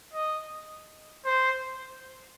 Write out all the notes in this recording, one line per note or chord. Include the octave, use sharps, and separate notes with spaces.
D#5
C5